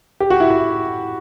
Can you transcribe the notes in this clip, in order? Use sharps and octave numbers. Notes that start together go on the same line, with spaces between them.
G4
F#4
E4
E4